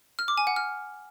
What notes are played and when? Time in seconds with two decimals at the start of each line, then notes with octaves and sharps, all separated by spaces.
0.19 F6
0.28 D6
0.38 G#5
0.47 F#5
0.56 F6